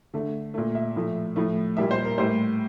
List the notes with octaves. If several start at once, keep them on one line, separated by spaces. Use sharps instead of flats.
D3 A3
A#2 A3
E5
A2 F3 A3
A2 F3 A3
A#2 G3 A#3 E5
C5
A#4
A2 G3 A#3 C5